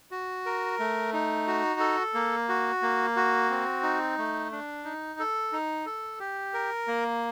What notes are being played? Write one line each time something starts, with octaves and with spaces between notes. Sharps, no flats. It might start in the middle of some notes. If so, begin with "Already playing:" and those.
F#4
A#4
A3
D#4
F#4
A4
A#3
F#4
A#3
F#4
C4
D#4
A3
D4
D#4
A4
D#4
A4
G4
A#4
A#3